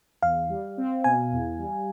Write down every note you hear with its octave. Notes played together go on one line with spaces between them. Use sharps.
E2 F5
G3
C4
B2 G#5
E2
G3